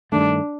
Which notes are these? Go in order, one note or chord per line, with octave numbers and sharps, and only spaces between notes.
G2 D#3 A3 D4